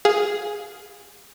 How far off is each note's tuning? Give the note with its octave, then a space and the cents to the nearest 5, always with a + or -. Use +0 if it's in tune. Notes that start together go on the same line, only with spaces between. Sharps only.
G#4 +0 F5 +10